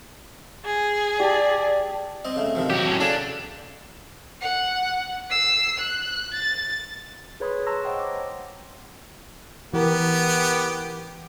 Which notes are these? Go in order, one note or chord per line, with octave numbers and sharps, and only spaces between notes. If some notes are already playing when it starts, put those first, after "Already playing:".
G#4
G4 D5 A5
C4 D#5
C#3 A3
C3 D#3 F3
F#3 F#4 G4
A2 C#4
C#3 D4 A4 G#5
F#5
E6 C7
F#6
A6
G#4 B4 C#5 B5 C6 D#6
A5 A#5 C6 C#6 E6 A#6
C5 C#5 D#5 F#5 G5 C6
D6
E3 B3 G4 A#4